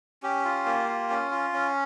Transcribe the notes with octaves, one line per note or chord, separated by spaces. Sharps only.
C#4 G4
F4
A#3
F4
C#4
F4
C#4